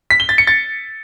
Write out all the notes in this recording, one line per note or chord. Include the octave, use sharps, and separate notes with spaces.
B6
G7
A6
C#7
A6